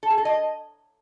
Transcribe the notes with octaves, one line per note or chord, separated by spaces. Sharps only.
A4
G#4
A4
D#5